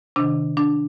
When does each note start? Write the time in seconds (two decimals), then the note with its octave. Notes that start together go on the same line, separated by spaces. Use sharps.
0.16 C3 D#3 D4
0.57 D4